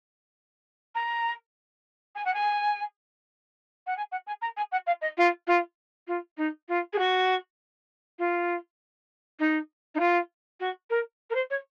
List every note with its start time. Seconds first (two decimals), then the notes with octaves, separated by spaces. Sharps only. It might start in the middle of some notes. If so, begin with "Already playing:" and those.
0.94 A#5
2.15 G#5
2.25 F#5
2.33 G#5
3.86 F#5
3.96 G#5
4.11 F#5
4.26 G#5
4.41 A#5
4.56 G#5
4.71 F#5
4.86 F5
5.01 D#5
5.17 F4
5.47 F4
6.07 F4
6.37 D#4
6.68 F4
6.92 G#4
6.98 F#4
8.18 F4
9.39 D#4
9.94 D#4
9.99 F4
10.60 F#4
10.90 A#4
11.30 A#4
11.34 C5
11.50 C#5